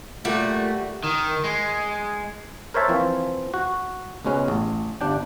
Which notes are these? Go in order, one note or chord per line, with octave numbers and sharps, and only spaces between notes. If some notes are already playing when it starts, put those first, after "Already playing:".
A#2 G3 A3 F#4
D#3
G#3
A#4 C5 C#5 E5 A5
E3 F3 C4 F4
F#4
C#2 B2 G#3 C#4 B4
A1
G1 G3 D4 G5